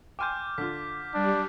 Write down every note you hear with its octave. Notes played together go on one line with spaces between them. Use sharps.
G5 G#5 C6 D6 F6 G6
D3 F4 F6 B6
G3 D4